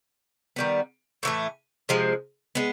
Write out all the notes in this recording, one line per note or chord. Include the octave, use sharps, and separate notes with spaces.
D#3 G3 B3
A2 E3 A3
C3 F3 G#3
G#3 B3